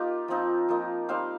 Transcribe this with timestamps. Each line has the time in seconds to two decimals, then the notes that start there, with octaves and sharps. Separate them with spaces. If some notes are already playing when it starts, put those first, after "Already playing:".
Already playing: A#3 D#4 F4 G4 A#4 D#5 G5
0.28 F3 C4 D#4
0.69 F3 A#3 D#4
1.09 G3 C4 D#4 C5 F5